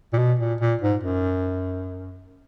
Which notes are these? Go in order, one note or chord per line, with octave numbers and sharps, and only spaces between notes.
A#2
B2
A#2
A#2
G#2
F#2